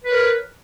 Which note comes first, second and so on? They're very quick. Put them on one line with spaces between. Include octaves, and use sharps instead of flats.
B4 C#5 A#4